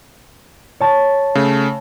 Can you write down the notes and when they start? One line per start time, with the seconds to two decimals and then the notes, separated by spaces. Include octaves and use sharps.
0.81 C#5 A5 A6
1.35 C#3 A3